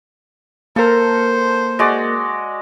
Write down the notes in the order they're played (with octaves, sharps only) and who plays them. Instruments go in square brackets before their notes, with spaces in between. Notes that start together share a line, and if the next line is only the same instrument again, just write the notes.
[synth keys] A#3 A#4 [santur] A4 [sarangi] C5
[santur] G#3 F#4 D5